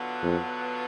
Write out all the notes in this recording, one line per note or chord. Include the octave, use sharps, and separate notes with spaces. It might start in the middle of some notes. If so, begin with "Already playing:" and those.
Already playing: D3 F#3 B3 D4 F4
F2